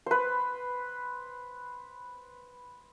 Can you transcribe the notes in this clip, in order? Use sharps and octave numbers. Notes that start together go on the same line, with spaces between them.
B4 C5